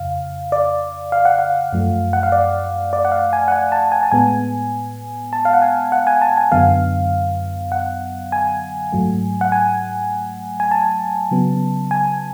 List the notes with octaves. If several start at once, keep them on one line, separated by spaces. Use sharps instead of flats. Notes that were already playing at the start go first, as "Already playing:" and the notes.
Already playing: F2 C#3 F5
D5
F5
F#5
F5
F#2 F3 A3
F#5
F5
D5
D5
F#5
F5
G#5
F#5
G#5
A5
G#5
A5
A2 G#3 B3 G#5
A5
F5
F#5
G#5
F#5
G#5
A5
G#5
F#2 D3 F#3 B3 F5
F#5
G#5
G#2 F#3 A3
F#5
G#5
G#5
A5
C#3 F#3 B3
G#5